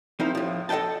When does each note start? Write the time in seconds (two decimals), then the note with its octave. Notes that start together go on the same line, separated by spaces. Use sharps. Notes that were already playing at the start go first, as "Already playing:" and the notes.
0.19 F3 C4 D#4 E4 G4 A#4
0.35 A2 F3
0.69 A4 D#5 F#5 G5 A5